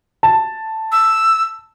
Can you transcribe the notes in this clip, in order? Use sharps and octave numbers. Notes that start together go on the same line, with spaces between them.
A5
E6